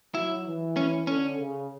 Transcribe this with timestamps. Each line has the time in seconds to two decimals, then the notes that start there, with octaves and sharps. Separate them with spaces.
0.15 F#3 E4
0.47 E3
0.77 C#4
1.07 D3 C#4
1.38 C#3